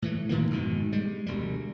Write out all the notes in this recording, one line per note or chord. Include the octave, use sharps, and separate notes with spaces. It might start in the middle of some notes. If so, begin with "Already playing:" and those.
A2 E3 A3
A2 D#3 E3 A#3
F1 G#2 B2 D#3
G3 G#3
E1 D2 G3